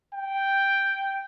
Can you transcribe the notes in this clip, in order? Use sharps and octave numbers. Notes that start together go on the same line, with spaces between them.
G5